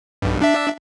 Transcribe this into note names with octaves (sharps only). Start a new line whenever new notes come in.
B1 G2
D4 E5